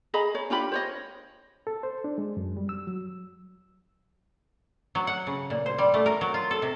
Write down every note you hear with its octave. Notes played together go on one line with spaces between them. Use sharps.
G#4 D#5 A#5 B5
C#5
D4 F4 G4 B5
C5 C#5 D#5
A4
C5
D4
G#3
F#2
G3
E6
F#3
F#3
F#5
C#3
A#2
C5
G3
A3
A#4
F#3
F4
A4
C3